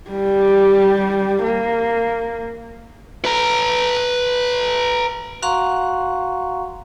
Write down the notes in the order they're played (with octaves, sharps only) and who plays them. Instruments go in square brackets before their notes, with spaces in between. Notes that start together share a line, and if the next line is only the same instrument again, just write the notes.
[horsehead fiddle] G3 G4
A#3
[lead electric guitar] B4 A#5
[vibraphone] F#4 F5 F#5 A#5 C6 C#6